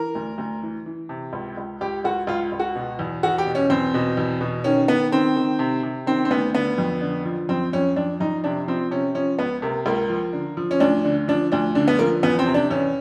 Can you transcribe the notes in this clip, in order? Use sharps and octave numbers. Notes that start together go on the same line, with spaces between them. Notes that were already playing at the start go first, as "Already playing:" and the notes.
Already playing: E3 A#4
D2
D2
E3
E3
C3
C#2
C#2
C#2 G4
C#2 F#4
C#2 F4
C#2
F#4
B2
E2
E2 F#4
G4
B2
C#4
E2 C4
B2
E2
B2
D#3 C#4
D#3 B3
D#3 C4
D#3
C3
C3
D#3 C4
C4
D2 B3
D3 B3
F2
D3
F3
F2 C4
F2 C#4
F2 D4
F2 D#4
C3 D4
F3 C4
C3 C#4
F3 C#4
C#2 B3
C3 A#3
C#2 A#3
F3
D3
F3
C#4
D2 D4
D3
F3 D4
D2 D4
D3 D4
B3
F3 A#3
E2 B3
C4
C3
D4
E2 C#4